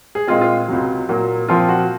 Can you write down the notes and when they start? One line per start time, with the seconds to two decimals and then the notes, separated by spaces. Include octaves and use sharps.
0.15 G#4
0.27 A#2 G#3 C4 F4
0.41 F4
0.68 C#2 C3 F#3
1.09 A#2 F#3 A#3
1.48 A#2 F3 C4 F4
1.69 F#4